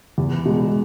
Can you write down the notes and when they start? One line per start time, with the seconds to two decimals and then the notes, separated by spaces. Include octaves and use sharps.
0.18 E2
0.45 B2 G#3